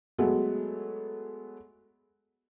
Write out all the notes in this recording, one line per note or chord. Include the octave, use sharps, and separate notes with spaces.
F#3 G#3 A3 B3